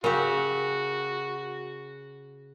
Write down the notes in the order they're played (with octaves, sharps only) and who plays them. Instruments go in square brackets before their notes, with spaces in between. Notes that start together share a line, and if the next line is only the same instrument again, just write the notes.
[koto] C#3 G4 [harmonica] F#4 [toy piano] A#4